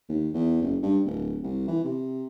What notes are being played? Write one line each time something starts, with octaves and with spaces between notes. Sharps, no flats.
D#2
E2
F#1
G2
D1
C2
E3
C3